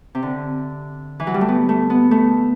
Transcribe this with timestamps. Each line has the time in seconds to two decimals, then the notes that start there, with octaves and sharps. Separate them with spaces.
0.15 C3
0.23 D3
1.20 E3
1.27 F#3
1.34 G3
1.41 A3
1.48 B3
1.69 A3
1.90 B3
2.11 A3